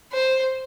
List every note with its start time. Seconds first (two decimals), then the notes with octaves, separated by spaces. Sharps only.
0.13 C5